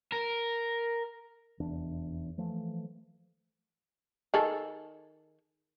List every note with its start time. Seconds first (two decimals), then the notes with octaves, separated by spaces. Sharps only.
0.12 A#4
1.60 F1 E2 D4
2.38 E3 F3 A3
4.34 D#3 G#4 A4